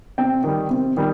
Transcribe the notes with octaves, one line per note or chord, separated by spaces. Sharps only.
C3 G5
D#3 G3
C3
D#3 G3